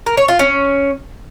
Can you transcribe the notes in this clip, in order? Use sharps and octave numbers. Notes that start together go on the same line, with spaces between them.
A#4
C#5
F4
C#4